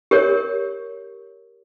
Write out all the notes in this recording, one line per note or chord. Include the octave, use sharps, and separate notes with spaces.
G4 A#4 C#5